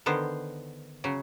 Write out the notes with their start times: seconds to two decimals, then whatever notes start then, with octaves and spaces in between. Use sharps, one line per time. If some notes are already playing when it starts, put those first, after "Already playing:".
0.06 D3 D#3 B3 C5
1.04 C#3 F#3